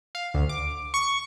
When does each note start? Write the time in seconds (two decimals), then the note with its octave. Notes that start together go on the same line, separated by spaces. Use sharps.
0.15 F5
0.34 D2
0.49 D6
0.94 C#6